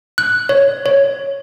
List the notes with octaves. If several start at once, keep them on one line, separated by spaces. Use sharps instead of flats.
F#6
C#5
C#5